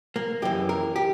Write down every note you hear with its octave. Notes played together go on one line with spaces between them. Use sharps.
A#3
F#2 E3 G4
A#4
G4